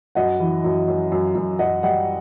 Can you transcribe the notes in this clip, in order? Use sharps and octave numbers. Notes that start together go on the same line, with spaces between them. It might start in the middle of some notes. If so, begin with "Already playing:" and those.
F#2 D#5 F#5
E3
F#2
F#2
F#2
F#2
F#2 D#5 F#5
G3 D#5 F#5